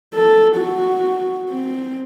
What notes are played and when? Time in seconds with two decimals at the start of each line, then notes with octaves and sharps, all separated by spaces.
0.14 A4
0.57 F#4
1.50 C4